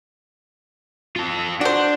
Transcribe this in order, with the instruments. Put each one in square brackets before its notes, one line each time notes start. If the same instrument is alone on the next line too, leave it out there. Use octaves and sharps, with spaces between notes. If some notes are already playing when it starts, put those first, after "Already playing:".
[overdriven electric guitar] F4 A4
[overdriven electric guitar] D4 [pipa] F#4 C5